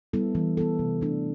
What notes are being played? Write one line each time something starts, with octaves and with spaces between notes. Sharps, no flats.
G3 B3 E4 A4
E3
B3 E4 A4
C3
E3 A3 D4 A4